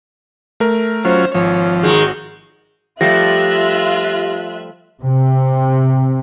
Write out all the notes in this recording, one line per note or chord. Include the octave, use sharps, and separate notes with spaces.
A3 A#4
F#3 C#4 F4 C5
G#1 F3 C#5
D#3 G#3 F#4
F3 G3 A3 F4 G4 E5 F#6 A#6
C3